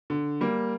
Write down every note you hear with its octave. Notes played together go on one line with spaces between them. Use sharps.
D3
G3 A#3